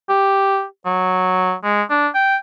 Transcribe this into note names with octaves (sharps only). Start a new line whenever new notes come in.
G4
F#3
G#3
D4
G5